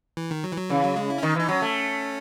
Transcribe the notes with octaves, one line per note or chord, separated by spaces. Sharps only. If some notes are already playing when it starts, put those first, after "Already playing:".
E3
D#3
F#3
E3
F#3
C#3 E3
F#3
G#3
E4
C#4
D#3 D#4
E3 D#4
F#3 C#4
A3